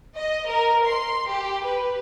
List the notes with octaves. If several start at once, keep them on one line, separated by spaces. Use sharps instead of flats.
D#5
A#4
C6
G4
B4